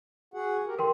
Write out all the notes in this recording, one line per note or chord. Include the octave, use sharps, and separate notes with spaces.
F#4 G#4 F#5
G4 A#4
D3 A#4 G5 C6